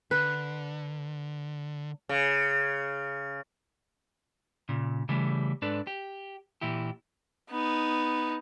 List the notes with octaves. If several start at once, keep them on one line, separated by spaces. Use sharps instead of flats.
D3 B4
C#3
A#2 C#3
C#3 E3 G3 A3
G#2 D4 A4 B4 D5
G4
A#2 E3 E4 G4
B3 D#4